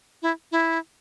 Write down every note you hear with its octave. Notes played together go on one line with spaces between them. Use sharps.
E4
E4